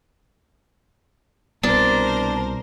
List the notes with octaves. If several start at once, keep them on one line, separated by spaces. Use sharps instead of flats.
C2 B2 B3 D4 A#4 C5